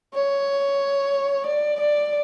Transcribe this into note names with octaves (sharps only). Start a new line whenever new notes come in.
C#5
D5
D5